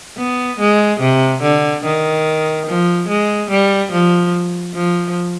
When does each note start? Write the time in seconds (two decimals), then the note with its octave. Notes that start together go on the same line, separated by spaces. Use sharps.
0.17 B3
0.60 G#3
1.00 C3
1.42 D3
1.85 D#3
2.67 F3
3.08 G#3
3.50 G3
3.92 F3
4.74 F3